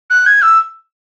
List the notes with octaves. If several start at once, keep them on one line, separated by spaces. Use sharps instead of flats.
F#6
G#6
E6